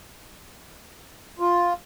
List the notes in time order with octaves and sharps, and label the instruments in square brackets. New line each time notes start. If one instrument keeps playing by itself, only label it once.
[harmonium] F4